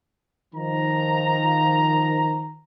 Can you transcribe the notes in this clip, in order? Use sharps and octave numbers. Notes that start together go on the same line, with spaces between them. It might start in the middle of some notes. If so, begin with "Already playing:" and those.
D#3 F3 A#5